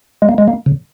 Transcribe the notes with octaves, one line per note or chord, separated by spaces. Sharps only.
G#3
A#3
G#3
A#3
C#3